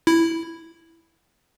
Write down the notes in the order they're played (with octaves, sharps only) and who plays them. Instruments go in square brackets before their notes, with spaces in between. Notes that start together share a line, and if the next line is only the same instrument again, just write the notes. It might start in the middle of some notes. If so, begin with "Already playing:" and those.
[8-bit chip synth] E4